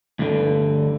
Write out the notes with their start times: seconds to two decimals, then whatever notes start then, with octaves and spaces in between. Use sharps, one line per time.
0.19 D2 G2 D3